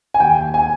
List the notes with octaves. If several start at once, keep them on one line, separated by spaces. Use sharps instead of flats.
G#5
D#2 G5
G#5